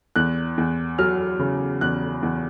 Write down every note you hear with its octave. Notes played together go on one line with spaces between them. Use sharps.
E2 F#6
E2
F#3 F6
C#3
E2 F#6
E2